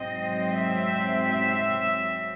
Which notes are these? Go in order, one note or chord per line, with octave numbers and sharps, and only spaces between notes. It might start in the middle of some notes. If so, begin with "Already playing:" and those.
Already playing: G#2 F#3 C4 D#5
E5
E5